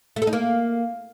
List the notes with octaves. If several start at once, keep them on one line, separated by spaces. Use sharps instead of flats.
A3
A4
D#4
A#3